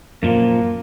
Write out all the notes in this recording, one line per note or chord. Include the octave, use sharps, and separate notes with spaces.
F#2 A#2 F3 A#3